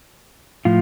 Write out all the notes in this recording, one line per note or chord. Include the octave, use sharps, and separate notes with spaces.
A2 F3 F4